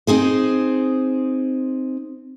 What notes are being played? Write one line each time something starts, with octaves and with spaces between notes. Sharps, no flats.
C4 D#4 G#4 C5